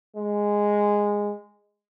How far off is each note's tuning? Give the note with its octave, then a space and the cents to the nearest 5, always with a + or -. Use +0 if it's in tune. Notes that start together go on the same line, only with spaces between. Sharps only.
G#3 -10